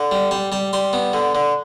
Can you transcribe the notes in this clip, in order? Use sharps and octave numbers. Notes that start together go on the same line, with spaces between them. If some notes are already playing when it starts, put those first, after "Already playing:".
Already playing: D3
G3
G3 A5
G3 A5
G3 C6
B3
D3
D3